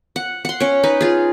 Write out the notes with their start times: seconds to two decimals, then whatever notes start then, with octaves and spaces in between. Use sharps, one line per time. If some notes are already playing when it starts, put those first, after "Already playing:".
0.16 F#5
0.45 F#5 C6
0.60 C#4 C#5
0.84 D#4 B4
1.01 F4 G#4